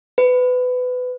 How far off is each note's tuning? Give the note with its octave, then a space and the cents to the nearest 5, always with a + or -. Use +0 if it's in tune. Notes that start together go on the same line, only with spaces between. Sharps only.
B4 +25